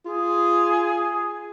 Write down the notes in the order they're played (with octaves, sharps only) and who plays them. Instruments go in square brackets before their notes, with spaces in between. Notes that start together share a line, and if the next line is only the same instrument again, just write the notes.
[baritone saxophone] F4 [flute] G#4